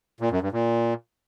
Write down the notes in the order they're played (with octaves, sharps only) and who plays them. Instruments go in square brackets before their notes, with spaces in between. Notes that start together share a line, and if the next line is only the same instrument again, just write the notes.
[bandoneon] A#2
F#2
G2
A#2